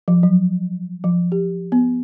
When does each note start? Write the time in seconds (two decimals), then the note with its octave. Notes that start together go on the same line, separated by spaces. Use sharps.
0.08 F3
0.23 F#3
1.04 F3
1.32 G4
1.72 B3